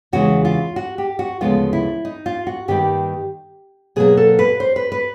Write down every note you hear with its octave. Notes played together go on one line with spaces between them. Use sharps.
E2 C#3 E3 G#3 F#4
F4
F#4
G4
F#4
D2 C#3 F3 G#3 B3 F4
E4
D#4
F4
F#4
G2 D#3 G3 A#3 G4
B2 F#3 A#3 G#4
A4
B4
C5
B4
B4